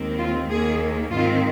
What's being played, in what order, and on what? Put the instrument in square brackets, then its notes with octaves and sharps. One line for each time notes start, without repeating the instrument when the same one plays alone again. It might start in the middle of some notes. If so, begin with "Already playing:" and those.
Already playing: [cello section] D#2 D#3 G#3 C4
F4
D#2 D#3 A#3 G#4
G#2 D#3 C4 F4